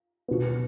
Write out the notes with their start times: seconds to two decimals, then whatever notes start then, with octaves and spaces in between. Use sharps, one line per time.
0.28 B2 B3